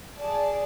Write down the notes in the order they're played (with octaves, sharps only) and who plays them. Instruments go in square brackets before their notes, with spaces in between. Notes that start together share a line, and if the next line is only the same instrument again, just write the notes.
[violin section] G#4 D5 A5